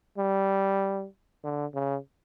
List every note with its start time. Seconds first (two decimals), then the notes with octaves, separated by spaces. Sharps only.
0.18 G3
1.44 D3
1.74 C#3